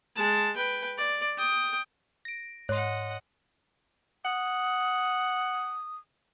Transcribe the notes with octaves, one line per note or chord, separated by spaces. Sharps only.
G#3 A5
B4 G5
D5
G5 D#6
A#6 D7
G#2 C#5 D#5 F#5 C6
F#5 D#6